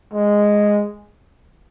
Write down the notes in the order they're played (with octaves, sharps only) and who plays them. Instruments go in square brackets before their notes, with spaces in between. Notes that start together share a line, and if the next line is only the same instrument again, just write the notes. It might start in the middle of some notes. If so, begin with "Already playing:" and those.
[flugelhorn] G#3